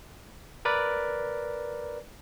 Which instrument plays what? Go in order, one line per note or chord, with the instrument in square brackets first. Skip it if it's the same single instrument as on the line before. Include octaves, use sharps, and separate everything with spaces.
[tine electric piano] A#4 B4 D5